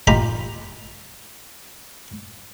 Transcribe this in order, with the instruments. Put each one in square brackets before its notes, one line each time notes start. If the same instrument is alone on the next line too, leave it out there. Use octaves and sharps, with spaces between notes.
[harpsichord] D#4 F4 G4 A#5 B5